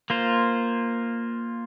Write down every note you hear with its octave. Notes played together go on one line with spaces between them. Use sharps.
A#3 F4 C5